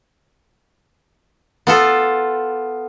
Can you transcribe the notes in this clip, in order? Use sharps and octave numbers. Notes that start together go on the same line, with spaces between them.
B3 F4 A4